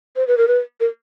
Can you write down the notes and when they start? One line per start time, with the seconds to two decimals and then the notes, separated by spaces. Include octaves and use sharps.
0.16 C5
0.27 B4
0.38 A#4
0.48 B4
0.80 A#4